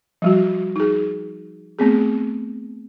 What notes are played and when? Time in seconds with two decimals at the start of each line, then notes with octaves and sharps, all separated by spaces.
0.22 F3 G3 F#4
0.76 D#4 G#4
1.79 A3 B3 C4 G#4